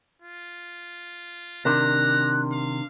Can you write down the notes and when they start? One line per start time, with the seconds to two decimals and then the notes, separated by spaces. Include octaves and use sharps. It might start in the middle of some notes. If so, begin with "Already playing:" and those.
0.22 F4
1.65 C3 D#3 D4 A#4 E5 A#5 F#6
2.53 F5